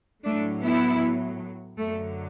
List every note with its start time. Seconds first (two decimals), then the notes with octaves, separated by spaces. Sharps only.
0.25 A2 F#3 A3 D4
0.64 B3 E4
1.78 F#2 D3 F#3 A3